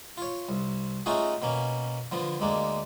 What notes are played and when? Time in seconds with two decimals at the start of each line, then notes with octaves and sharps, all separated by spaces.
0.18 F4 C#5
0.49 C2
1.06 A3 C#4 D#4 F4 F#4 G#4
1.42 B2 A#3 C#4
2.12 D3 F3 B3
2.40 D2 G#3 A#3 D4